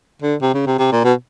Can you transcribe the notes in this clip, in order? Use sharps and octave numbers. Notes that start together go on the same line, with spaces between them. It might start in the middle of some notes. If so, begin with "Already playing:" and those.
D3
C3
C#3
C3
C3
A#2
B2